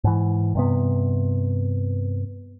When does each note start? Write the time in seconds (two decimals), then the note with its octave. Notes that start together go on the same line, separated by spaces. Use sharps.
0.04 G#2 E3
0.55 G2 C3 B3